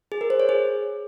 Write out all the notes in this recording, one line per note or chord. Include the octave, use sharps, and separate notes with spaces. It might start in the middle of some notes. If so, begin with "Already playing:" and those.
G#4
A#4
C5
C#5
G#4